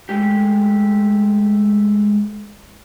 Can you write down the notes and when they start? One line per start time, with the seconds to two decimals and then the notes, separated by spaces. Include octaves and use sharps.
0.09 G#3 A3 G4